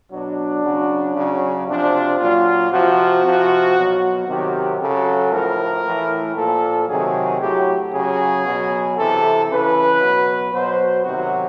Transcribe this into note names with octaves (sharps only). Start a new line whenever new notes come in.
B2 F#3 D4
C#3 F#3
C#3 F#3
C3 F3 D4
A#2 F#3 F4
C3 F3 F#4
C3 F3
B2 F#3
C3 D#3 F#3 G4
C#3 F#3 A4
A2 F3 A#4
A2 E3
A#2 F3 A4
C3 D#3 F#3 G#4
A2 F#3 G4
C#3 F#3 G#4
B2 F#3
C3 E3 A4
C#3 E3 B4
B2 F#3
B2 F#3 C5
C3 D#3 F#3 F#4